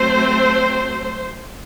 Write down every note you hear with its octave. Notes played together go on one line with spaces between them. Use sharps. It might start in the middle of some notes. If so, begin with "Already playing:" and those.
Already playing: F#3 A3 C4 C5